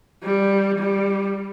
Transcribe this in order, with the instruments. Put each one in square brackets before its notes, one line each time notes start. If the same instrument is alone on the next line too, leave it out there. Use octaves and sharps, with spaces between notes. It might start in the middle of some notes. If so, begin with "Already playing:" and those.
[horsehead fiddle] G3
G3